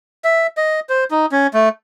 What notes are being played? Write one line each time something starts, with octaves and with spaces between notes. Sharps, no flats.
E5
D#5
C5
D#4
C#4
A3